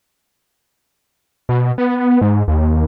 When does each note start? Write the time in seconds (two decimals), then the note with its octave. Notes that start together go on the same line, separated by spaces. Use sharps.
1.49 B2
1.78 B3
2.21 G#2
2.48 D#2